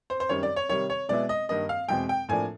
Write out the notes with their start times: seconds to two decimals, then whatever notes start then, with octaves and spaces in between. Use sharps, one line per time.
0.10 C5
0.20 C5
0.29 F#2 D#3 G3 C#5
0.43 D5
0.56 C#5
0.69 C3 D#3 G3 C#5
0.90 C#5
1.09 B2 G#3 B3 E4 D5
1.29 D#5
1.49 G2 D#3 G3 A#3 D#5
1.69 F5
1.88 E2 B2 G#3 C4 G5
2.09 G5
2.29 A2 F3 A#3 D4 G#5